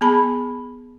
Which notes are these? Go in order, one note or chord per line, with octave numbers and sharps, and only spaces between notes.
B3 G#4 A5 B5